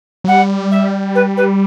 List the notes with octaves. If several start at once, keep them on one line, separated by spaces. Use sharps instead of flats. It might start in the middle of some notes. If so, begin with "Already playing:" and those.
F#3
G3 F#5
E5
B4
B4